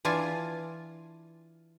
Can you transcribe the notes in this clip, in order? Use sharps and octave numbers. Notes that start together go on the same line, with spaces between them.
E3 D4 F4 G#5